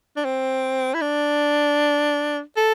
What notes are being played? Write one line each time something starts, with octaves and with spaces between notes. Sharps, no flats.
D4
C4
E4
D4
A4